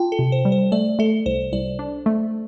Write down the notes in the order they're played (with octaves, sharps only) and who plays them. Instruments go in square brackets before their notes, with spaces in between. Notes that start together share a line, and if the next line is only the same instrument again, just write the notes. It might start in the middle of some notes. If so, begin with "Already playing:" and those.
Already playing: [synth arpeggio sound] F4 [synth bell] G5 A5
[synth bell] A4
[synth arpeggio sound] C3
[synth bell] C5
[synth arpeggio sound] G3
[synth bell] C5
[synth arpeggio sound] A3 [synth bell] D5
[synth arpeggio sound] A3 [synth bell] A4
[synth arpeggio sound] C2 [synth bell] C5
[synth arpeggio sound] C2 [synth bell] D5
[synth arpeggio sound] D4
A3